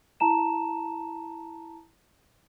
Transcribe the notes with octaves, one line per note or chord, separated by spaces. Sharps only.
E4 A5 A#5 E7